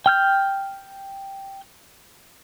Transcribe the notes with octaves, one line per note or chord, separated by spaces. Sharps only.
G5 F6 G6